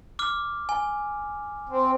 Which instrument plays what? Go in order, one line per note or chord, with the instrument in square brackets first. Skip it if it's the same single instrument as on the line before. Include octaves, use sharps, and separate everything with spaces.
[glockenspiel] D6 F6
G#5
[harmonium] C4